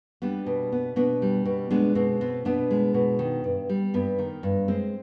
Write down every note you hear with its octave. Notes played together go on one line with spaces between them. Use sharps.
G3 B3 D4
B2
B3
B2 B3 D4
G3
B2
G#3 B3 D4
B2 C4
B3 C4
B2 B3 D4
G#3
B2
D#3
G2
G3
G2 B3
D#3
G2
G#3 C4